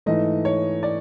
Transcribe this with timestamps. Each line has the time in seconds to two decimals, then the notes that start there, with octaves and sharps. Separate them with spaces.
0.06 G#2 E3 A3 D#5
0.45 C#5
0.83 D5